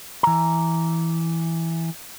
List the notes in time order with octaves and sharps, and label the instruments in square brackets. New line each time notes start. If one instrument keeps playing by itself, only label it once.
[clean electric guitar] E3 A#5